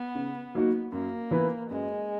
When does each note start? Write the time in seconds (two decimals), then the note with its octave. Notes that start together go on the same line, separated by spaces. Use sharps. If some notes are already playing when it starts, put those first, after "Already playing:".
Already playing: B3
0.15 C#3
0.54 F#3 A#3 D#4 F#4
0.92 F#2 A#3
1.31 E3 B3 E4 B4
1.70 F#2 G#3